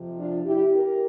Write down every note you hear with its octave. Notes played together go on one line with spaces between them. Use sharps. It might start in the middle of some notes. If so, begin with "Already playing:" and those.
Already playing: F2 C3 F3
D4 F4
E4 G4
G4 A#4